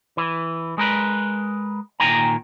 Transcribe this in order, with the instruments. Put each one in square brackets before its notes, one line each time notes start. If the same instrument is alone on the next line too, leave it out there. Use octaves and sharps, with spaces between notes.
[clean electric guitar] E3
G#3 A#4 B4
A#2 D#3 G5 G#5 A#5